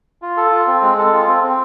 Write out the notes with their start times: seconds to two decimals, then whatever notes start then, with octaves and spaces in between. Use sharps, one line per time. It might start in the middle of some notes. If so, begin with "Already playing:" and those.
0.22 F4
0.37 A4
0.51 F4
0.67 C4
0.82 G#3
0.98 A4
1.13 F4
1.28 C4
1.43 C4